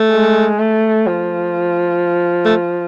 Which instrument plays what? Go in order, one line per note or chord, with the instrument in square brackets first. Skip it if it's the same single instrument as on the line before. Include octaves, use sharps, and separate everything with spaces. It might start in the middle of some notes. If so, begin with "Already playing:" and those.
Already playing: [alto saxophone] A3
[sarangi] G#3
A3
F3
[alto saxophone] A3